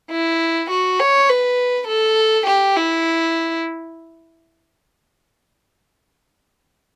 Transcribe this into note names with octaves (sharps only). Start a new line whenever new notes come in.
E4
F#4
C#5
B4
A4
G4
E4